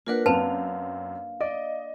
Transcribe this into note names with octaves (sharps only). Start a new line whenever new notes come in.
A#3 D4 F4 A#4 B4 F#5
F#2 C4 B4 F5 A5 F7
D5 D#5